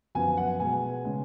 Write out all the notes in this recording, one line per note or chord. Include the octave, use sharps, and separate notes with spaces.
F#2 F3 B3 G#5
F#5
B2 G#3 B3 G#5
C#3 G#3 C#4